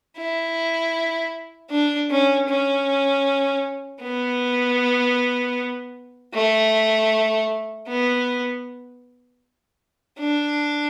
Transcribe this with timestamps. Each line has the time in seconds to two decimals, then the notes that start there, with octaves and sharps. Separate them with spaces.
0.18 E4
1.70 D4
2.10 C#4
2.49 C#4
4.02 B3
6.34 A3
7.87 B3
10.19 D4